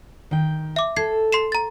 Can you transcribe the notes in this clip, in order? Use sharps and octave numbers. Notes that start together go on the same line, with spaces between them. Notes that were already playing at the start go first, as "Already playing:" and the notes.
D#3 G5
E5 D6
A4 G#6 C7
C6 C7 E7
A#5 A6